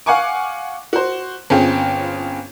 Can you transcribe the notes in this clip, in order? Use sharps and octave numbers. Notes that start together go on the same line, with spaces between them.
F5 F#5 G#5 C#6 D6
F#4 C5
G1 C4 C#4 F4 G#4 G5